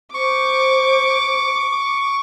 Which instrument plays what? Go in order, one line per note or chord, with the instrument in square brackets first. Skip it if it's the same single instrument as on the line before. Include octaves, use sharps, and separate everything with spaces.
[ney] C5 [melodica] C#6 [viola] D6